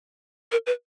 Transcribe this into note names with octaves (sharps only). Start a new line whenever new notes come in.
A#4
B4